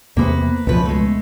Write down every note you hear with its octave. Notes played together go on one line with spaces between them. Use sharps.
E2 C3 A#3 B3 B4 C5
C#2 B2 E3 F3 B4
G#3 A3